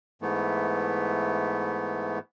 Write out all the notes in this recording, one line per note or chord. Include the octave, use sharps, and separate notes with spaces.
G#2 E3 A3 B3